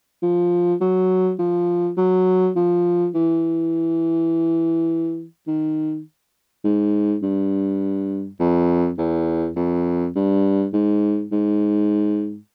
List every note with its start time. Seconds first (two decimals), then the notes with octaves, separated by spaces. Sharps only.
0.22 F3
0.81 F#3
1.39 F3
1.97 F#3
2.56 F3
3.15 E3
5.47 D#3
6.64 G#2
7.23 G2
8.40 F2
8.98 E2
9.56 F2
10.15 G2
10.73 G#2
11.32 G#2